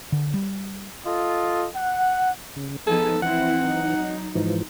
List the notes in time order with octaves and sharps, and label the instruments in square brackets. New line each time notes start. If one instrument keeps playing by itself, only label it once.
[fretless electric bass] D3
G3
[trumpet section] F4 A4 D#5
F#5
[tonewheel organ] C#3
[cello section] F3 B3 D#4 [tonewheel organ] G#4 G#5 [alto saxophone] A4
[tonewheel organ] E3 [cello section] C4 E4 [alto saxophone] F#5
[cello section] F#3 D#4
[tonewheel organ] G#2 E3 F3